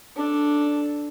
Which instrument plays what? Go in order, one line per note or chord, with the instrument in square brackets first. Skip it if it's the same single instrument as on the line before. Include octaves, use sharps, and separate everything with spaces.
[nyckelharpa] D4 A4